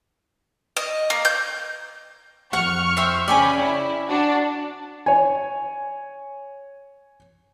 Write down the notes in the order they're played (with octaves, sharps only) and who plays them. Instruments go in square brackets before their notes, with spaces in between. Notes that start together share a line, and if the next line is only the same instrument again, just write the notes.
[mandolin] D#5
A#3
G6
[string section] F2 C#6 F6 [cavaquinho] F#5
[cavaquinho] C5 E5 G5
[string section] C#3 C#4 B5 [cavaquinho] D5 G5 G#5
[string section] E4
D4 F#4
[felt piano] C#5 G#5